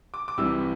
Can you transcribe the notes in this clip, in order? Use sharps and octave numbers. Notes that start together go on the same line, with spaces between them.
D6
D6
C2 C3 E3 G3 E6